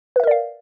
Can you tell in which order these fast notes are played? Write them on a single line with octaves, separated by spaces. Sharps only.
B4 E5 A#4 D5 F5